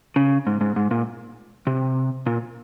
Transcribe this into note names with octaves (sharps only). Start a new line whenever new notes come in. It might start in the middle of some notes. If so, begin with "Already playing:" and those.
C#3
G#2
G#2
G#2
A#2
C3
A#2